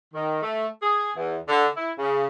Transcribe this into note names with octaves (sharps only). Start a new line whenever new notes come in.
D#3
A3
G#4
E2
D3
E4
C#3